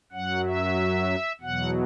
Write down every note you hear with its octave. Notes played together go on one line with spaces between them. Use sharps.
F#2 F#3 F#5
E5
E2 B2 F#3 F#5